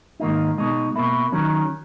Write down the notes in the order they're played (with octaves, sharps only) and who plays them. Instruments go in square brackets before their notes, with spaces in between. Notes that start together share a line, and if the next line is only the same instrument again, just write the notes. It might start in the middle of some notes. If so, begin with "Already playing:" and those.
[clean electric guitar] G#2 D#3 A#3 D#4
B2 G#3 D#4
B2 A#3 E4
D#3 F#3 C#4